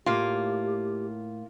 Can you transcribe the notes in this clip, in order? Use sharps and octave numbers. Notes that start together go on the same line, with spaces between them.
A2 A#3 F4 G4